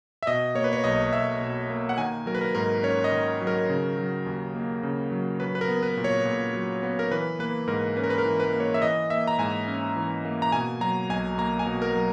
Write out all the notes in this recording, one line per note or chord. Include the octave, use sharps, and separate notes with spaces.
E5
B2 D#5
A#3 C#5
B4
C#5
B1 D#5
B1 E5
B2
A#3
F#5
D#3 G#5
F#3 A#4
B4
A#4
G#2 A#4
C#4 C#5
D#5
D#3
F#3
A#4
C#3
F#3
D#2
A#3
C#3
F#3
F#3 B4
B4
A#4
B3
B4
A#2
C#5
A#2
F#3
B3
A#4
E3 B4
A#3 B4
G#2 A#4
C#4 B4
A#4
B4
A#4
E3
B4
A#3
C#5
E5
E3 D#5
A#3 E5
A#5
G#2 G#5
C#4
E3
A#3
A#5
B2 G#5
F#3 A#5
B1 G#5
A#3 A#5
G#5
B2
A#4
F#3